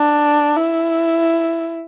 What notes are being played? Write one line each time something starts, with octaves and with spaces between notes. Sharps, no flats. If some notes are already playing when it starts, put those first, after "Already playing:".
Already playing: D4
E4